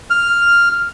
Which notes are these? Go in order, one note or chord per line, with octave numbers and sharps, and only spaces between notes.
F6